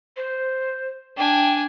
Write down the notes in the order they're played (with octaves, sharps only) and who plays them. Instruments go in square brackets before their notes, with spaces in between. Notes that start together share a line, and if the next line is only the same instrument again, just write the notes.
[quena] C5
[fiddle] D4 G#5 [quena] G5